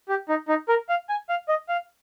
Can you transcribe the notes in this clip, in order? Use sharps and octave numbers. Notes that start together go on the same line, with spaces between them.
G4
D#4
D#4
A#4
F5
G#5
F5
D#5
F5